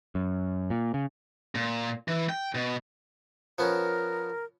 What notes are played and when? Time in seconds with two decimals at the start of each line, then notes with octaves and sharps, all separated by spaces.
0.15 F#2
0.70 A#2
0.94 C#3
1.55 A#2
2.08 E3
2.29 G5
2.55 B2
3.58 F3 B3 C#4 A#4